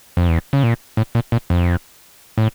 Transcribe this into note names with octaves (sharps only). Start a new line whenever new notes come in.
F2
E2
C#3
A#2
A2
A#2
A#2
F2
A2